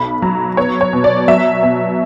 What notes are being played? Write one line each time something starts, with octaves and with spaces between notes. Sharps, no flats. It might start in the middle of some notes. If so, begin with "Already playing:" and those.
Already playing: B1 B5
F#3 A#5
B3 C#5
C#5
B2
D5
F#3 E5
B2